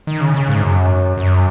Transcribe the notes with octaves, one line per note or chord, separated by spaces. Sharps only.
D#3
C#3
C#3
G#2
F#2
F#2